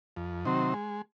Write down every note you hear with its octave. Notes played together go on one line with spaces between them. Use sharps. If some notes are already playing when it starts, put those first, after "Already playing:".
F2
C3 D#3 F#3 C4
G#3